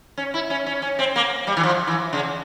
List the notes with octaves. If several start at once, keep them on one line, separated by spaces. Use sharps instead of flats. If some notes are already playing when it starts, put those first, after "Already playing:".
C#4
E4
C#4
C#4
C#4
C4
A#3
G3
E3
F3
E3
C#3